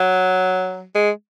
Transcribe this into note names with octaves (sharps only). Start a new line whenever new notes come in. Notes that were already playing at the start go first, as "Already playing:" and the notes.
Already playing: F#3
G#3